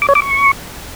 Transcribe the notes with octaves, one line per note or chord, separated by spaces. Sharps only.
D6
C#5
D6
C#6